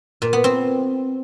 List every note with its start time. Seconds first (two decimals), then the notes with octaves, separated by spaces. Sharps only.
0.22 A#2
0.33 B3
0.44 C4